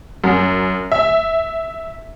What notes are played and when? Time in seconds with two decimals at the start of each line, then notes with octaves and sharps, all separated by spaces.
0.24 F#2
0.92 E5